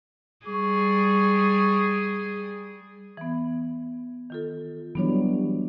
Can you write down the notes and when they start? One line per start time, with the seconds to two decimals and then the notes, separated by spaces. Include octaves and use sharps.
0.47 G3 G#4 C#6
3.17 E3 B3
4.30 D#3 F4 A4
4.95 E3 F#3 G3 B3 D4 C#5